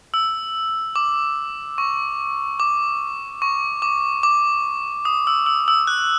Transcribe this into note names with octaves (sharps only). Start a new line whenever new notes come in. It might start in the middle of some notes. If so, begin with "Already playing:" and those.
E6
D6
C#6
D6
C#6
D6
D6
D#6
E6
E6
E6
F#6